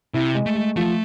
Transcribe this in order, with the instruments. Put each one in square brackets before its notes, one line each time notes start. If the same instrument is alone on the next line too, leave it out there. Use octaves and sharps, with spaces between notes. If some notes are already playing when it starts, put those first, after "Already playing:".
[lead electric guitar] C3 [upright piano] E4
[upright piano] G#3
[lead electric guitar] A3
[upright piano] G#3
[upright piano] F3 [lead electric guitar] A3